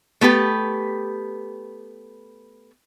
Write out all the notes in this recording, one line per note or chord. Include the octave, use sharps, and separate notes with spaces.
A3 B3 G4 B4